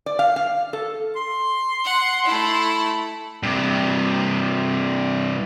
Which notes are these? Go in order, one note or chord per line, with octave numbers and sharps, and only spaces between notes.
D5
F5
F5
A4
C6
F#5
A3 E4
G2 C3